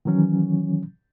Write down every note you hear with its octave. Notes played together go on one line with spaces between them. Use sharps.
D#3 E3 F#3 C#4